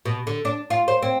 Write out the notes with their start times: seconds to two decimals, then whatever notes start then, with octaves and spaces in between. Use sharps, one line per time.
0.05 B2
0.27 D3
0.45 D4
0.70 F4
0.88 C5
1.02 C4